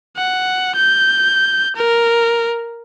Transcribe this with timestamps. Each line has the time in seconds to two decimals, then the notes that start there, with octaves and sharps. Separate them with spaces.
0.17 F#5
0.76 G6
1.76 A#4